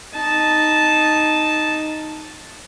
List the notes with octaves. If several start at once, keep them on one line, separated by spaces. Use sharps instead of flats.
D#4 A5